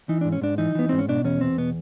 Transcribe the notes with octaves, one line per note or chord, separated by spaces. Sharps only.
E3 D#4
G#2 D4
C#4
G#2 D4
E3 D#4
E3 B3
G#2 C4
C#4
B2 D4
E2 C#4
E2 C4
B2 B3